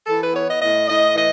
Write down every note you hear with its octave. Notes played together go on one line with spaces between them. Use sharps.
E3 A4
B4
B3 C#5
D#5
A2 D#5
A2 D#5
E3 D#5